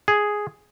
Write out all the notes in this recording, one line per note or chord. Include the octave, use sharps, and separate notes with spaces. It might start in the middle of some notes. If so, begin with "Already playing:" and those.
G#4